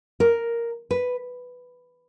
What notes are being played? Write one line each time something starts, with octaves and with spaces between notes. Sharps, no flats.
A#4
B4